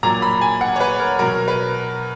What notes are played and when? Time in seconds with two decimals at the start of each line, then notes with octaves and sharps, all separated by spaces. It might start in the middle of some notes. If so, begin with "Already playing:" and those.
0.03 A#2 F#3 A#5
0.22 B5
0.41 G#5
0.61 F#5
0.76 C#5
0.80 B4
1.00 A#4
1.19 B2 F#3 A#4
1.48 B4